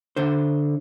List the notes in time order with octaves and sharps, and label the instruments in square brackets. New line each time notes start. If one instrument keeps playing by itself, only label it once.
[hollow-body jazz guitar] D3 C5